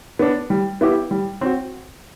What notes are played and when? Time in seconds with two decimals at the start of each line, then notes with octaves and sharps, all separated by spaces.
0.19 B3 D4
0.50 G3
0.81 B3 E4 G4
1.11 G3
1.41 C4 F#4